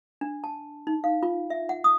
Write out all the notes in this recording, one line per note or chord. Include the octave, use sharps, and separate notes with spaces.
D4
A5
D#4
F5
F4
E5
F#5
D#6